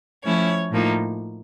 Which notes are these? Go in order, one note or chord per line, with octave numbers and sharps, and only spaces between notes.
F3 A3 C#4 E4 C#5
A2 F3 A#3 D#4